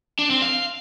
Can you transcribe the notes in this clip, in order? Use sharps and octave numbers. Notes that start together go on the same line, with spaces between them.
D4
C4
F5